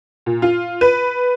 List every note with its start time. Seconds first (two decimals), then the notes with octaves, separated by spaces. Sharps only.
0.26 A#2
0.42 F4
0.81 B4